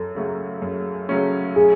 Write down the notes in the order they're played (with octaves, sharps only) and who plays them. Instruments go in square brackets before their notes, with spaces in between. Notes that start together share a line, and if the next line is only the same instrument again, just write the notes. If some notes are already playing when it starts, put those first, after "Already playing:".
Already playing: [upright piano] F#2 [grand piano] A4
[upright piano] C#3 F#3 A3 C#4
F#2
C#3 F#3 A3 C#4
[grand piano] G#4